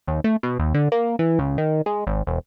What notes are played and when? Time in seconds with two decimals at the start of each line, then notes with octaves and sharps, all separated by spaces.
0.08 D#2
0.24 A3
0.43 B2
0.59 D#2
0.74 D3
0.92 A#3
1.19 E3
1.39 C#2
1.58 D#3
1.86 G#3
2.07 G#1
2.27 E1